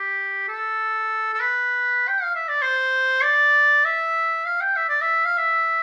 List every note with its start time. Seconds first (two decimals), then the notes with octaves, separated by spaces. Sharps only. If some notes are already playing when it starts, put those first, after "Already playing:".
Already playing: G4
0.48 A4
1.33 A4
1.40 B4
2.08 G5
2.22 F5
2.35 E5
2.48 D5
2.62 C5
3.23 D5
3.84 E5
4.45 F5
4.61 G5
4.76 E5
4.89 D5
5.01 E5
5.25 F5
5.37 E5